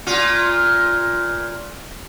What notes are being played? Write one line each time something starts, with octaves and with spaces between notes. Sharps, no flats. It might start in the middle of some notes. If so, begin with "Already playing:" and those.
A#2 F4